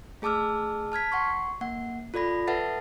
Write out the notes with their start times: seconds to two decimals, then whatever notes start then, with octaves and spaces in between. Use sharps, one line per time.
0.22 A3 G#4 A5 D6 E6 F6
0.92 A5 F6 G#6 B6
1.12 F#5 C6 C#6
1.61 A#3 F#5
2.14 F4 A4 D5 B5 A#6
2.47 A4 B4 E5 F#5 A5 A6